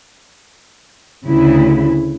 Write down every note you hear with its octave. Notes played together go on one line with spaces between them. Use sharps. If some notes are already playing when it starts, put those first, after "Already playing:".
D2 C#3 E4